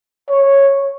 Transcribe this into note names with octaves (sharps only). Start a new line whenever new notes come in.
C#5